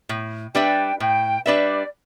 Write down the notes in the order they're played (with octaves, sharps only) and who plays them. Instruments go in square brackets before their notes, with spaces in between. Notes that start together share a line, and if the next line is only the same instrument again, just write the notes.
[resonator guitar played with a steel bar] A2
[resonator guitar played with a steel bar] G3 D4 B4 E5 [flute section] G5
[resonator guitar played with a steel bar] A2 [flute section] G5
[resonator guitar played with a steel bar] G3 D4 B4 E5 [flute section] D5